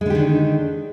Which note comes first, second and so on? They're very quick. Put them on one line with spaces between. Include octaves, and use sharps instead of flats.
G#3 D3 G4 D#3 D4